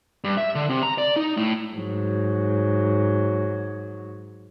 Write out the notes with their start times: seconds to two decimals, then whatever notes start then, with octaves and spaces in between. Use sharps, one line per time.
0.24 G2
0.38 E5
0.55 D3
0.69 C3
0.83 A#5
0.98 D5
1.16 D#4
1.37 A2
1.74 G#2 F#3